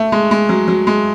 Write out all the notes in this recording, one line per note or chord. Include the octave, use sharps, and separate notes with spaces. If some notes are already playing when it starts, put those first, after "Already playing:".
Already playing: A3
G#3
G#3
F#3
F#3
G#3